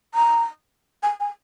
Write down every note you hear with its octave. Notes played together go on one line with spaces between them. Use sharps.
A#5
G#5
G#5